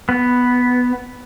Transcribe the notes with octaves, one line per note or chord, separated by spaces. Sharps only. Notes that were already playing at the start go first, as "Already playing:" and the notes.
B3